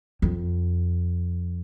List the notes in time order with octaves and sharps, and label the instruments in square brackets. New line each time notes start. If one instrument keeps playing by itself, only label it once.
[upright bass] F2